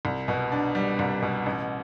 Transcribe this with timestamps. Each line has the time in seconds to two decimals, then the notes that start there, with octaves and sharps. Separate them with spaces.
0.05 C2
0.28 B2
0.52 D4
0.75 G3
0.99 C2
1.22 B2
1.46 A1